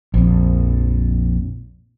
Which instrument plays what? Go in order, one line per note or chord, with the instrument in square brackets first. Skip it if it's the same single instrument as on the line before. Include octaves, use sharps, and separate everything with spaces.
[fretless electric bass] A#1 F2